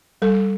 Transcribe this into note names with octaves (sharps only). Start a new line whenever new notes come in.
G3 A4